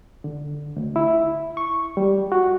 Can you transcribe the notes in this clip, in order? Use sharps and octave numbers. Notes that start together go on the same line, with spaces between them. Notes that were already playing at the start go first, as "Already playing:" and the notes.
D3
D2
E4
C#6
G3
F#4